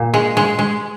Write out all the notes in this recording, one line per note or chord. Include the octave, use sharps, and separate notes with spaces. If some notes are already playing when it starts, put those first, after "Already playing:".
Already playing: A#2
G#3
G#3
G#3